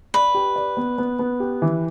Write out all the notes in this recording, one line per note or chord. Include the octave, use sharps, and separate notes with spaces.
B4 D5
G4
D5
B3
B3
B3
G4
E3